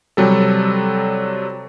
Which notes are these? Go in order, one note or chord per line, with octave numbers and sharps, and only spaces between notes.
C3 F#3 G3 A4